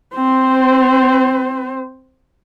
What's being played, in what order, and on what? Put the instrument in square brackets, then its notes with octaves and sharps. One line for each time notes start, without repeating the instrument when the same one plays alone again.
[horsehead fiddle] C4 C5